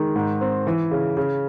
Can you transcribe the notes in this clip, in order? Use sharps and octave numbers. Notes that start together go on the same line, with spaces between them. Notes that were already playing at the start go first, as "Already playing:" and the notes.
Already playing: D#3 G#3
G#2
C4
E3
C#3
C#3